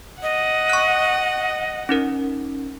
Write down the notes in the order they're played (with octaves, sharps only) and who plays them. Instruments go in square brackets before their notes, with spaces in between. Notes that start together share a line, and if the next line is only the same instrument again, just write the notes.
[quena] D#5 [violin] F#5
[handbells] C#6 F#6
C#4 D#4 A#4